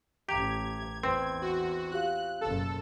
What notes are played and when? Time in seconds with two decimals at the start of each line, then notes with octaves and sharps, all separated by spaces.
0.29 A1 G4 A#5 G#6 F7
1.03 E2 C4 B4
1.42 F#4
1.91 F4 G4 F5 F#6
2.41 F#1 B2 A4